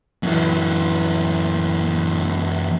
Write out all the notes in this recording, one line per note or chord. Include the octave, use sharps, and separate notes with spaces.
F#2 E3